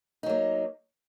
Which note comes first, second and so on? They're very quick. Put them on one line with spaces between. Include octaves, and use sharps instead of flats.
D#4 F#3 A#3